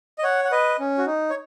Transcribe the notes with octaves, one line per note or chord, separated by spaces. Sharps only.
D#5
C#5 F#5
F#5
B4 D#5
C#4
F#4
D#4
C#5